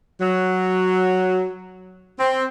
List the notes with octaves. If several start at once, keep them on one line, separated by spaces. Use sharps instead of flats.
F#3
C4